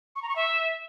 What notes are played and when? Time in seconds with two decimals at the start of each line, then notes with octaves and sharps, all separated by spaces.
0.16 C#6
0.22 A#5
0.29 C#6
0.36 E5